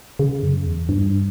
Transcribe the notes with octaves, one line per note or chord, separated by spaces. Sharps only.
C#3
F#2
E2
G2